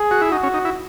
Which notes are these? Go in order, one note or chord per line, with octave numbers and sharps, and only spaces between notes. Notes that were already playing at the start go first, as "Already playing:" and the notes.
Already playing: G#4
F#4
E4
D#4 F#4
C#4
D#4
E4